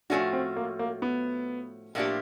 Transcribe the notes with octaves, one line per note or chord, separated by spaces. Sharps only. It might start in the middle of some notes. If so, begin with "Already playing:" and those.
A2 F3 A3 C#4 D4 F#4
C4
A#3
A#3
B3
A2 F3 A#3 D4 G4